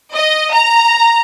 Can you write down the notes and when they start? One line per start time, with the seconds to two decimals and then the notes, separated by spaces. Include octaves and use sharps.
0.14 D#5
0.53 A#5